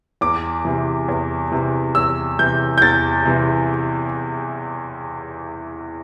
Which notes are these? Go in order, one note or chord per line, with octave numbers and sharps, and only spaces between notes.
E2 D6
C3 E3
E2
C3 E3
E2 E6
C3 E3 G6
G6
E2 A6
C3 E3